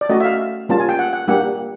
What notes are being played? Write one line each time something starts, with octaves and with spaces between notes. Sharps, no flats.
D5
A3 C#4 F#4 D#5
E5
F5
G3 A#3 C#4 F4 A5
G#5
G5
F#5
F#5
G3 A#3 D4 G4 F#5